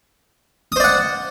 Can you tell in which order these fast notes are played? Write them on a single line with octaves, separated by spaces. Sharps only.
D#6 C5 D5 F#5